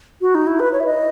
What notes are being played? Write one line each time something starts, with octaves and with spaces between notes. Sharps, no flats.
F#4
D#4
E4
B4
C#5
E5
D#5